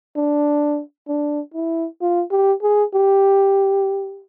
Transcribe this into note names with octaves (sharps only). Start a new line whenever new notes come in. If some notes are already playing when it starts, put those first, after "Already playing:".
D4
D4
E4
F4
G4
G#4
G4